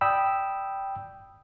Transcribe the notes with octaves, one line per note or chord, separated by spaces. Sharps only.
D5 G5 B5 D#6 E6